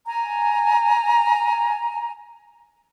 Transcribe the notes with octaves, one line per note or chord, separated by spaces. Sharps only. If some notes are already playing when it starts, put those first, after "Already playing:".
G#5 A#5